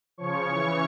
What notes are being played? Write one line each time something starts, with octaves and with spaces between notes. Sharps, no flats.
C#3 F3 C#5 C#6
C#3 E3